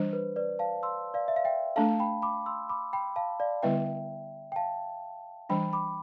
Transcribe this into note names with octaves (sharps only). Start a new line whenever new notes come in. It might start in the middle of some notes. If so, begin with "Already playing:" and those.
Already playing: E3 G3 D4 C5
B4
B4 D5
F5 A5
C6 E6
D5 F5
E5
F5
E5 G5
A3 D4 A4 F5 A5
G5 B5
B5 D6
C6 E6
B5 D6
G5 B5
F5 A5
D5 F5
D3 G3 B3 E4 B4 E5 G5
G5
F5 A5
E3 G3 D4 G5 B5
B5 D6